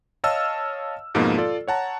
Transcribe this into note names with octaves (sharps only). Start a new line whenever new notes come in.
C#5 D#5 F5 A5 E6 F6
F2 G#2 B2 F3 A#3
F4 A4 D5
C#5 F#5 A5 A#5